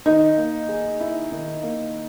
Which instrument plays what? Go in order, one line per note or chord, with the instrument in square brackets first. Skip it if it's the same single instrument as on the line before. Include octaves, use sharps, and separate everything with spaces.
[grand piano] D#3 [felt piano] D#4
[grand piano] A#3
G#4
E4
D#3
A#3